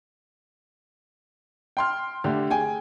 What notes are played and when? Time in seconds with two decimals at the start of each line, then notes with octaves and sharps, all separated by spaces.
1.77 G5 C6 F6
2.24 D3 A3 G4
2.50 G#4 G5 G#5